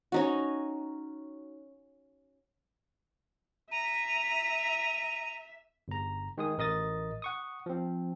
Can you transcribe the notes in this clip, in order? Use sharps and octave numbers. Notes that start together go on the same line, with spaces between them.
C#4 D#4 F#4
E5 A#5 D#7
G1 A#5
D#3 G#3 G#4 D#6
A1 A#4 D#5 D#6 A6
F#5 C#6 D#6
F3 C4